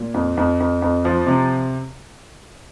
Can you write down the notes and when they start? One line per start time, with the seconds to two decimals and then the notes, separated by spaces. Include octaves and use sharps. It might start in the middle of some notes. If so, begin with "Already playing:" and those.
Already playing: A#2
0.14 F2
0.37 F2
0.60 F2
0.82 F2
1.05 F3
1.27 C3